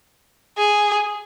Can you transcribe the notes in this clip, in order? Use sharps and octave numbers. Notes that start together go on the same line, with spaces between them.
G#4